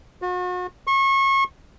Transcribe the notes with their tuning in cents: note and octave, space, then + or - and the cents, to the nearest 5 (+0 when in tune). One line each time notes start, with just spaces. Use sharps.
F#4 -40
C#6 -30